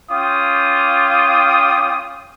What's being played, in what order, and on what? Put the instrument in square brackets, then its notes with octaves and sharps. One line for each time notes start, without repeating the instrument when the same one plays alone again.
[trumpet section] C#4 F4 G5 D6 D#6